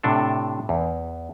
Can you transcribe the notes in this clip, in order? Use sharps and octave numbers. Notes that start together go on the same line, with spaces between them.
A2 C3 D4 A4
E2